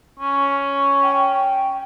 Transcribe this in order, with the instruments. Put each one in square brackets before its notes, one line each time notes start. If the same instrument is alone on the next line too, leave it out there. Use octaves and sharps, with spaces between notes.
[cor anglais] C#4
[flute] G5